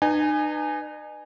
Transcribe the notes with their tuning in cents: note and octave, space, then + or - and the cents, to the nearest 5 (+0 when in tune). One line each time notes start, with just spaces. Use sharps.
D#4 -40 B4 +0 G#5 +0